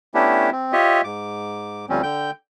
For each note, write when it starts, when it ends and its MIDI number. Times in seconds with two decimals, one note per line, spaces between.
0.14 0.50 57
0.14 0.50 59
0.14 0.50 61
0.14 0.50 62
0.14 0.50 64
0.14 0.50 67
0.52 0.73 60
0.73 1.01 65
0.73 1.01 67
0.73 1.01 73
0.73 1.01 75
0.73 1.01 76
1.04 1.86 44
1.04 1.86 86
1.89 2.02 38
1.89 2.02 53
1.89 2.02 55
1.89 2.02 60
1.89 2.02 61
2.03 2.31 50
2.03 2.31 79
2.03 2.31 91